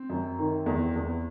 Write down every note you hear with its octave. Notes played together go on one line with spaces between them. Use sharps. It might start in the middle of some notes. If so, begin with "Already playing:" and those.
Already playing: C4
F#2
D#3
E2
E2